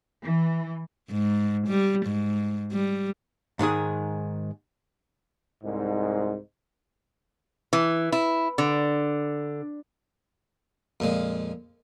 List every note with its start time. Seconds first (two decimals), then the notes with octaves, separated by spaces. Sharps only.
0.24 E3
1.10 G#2
1.67 G3
2.06 G#2
2.72 G3
3.59 G#2 D#3 G#3 G#4
5.62 C2 G#2
7.73 E3
8.12 E4
8.58 D3
11.00 F2 A#2 G#3